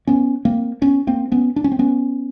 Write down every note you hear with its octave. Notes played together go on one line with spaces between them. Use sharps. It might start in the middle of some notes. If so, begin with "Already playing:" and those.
B3 C#4
A#3 C4
B3 C#4
A#3 C4
B3 C#4
D4
C#4
C4
B3 C#4